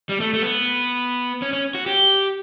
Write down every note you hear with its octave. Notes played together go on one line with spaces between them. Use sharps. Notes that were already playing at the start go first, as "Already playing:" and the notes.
G3
A3
A3
B3
C#4
C#4
F#4
G4